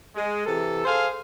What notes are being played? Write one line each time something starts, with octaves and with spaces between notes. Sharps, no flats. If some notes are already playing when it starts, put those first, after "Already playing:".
G#3
C3 E3 A4
G#4 A4 C5 F5